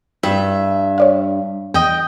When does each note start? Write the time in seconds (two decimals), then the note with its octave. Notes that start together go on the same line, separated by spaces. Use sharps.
0.23 G2 E5
0.98 C#5 D5 F5
1.74 E2 D#5 G5